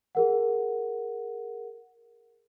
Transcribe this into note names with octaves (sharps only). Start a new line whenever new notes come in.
G#4 A#4 F#5